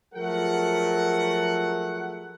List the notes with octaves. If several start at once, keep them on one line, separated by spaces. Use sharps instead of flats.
F3 F#3 A3 G#4 A#4 F#5